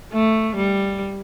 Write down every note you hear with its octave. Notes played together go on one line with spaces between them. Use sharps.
A3
G3